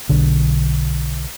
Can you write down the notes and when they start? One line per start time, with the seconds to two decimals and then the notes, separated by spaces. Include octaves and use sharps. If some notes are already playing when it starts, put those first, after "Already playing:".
0.09 B1 D3